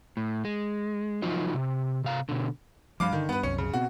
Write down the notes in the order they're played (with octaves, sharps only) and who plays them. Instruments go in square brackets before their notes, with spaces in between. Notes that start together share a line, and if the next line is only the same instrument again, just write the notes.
[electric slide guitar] A2
G#3
F3 F#3 D#4 F4 D#5
C3
C3 F5 A#5
B2 D3
[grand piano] G2 F5 D6 [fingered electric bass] F3 G3
[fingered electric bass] D3 [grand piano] D#3
[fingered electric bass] G2 [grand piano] B3 B4
[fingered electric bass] C2 F#2 [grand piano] C#4 C#7
[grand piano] C#3
[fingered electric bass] B2 B3 C4 [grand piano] F#4